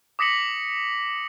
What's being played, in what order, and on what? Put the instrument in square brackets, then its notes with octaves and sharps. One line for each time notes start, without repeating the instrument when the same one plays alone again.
[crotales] D6 D#6 A#6 B6 C#7 F#7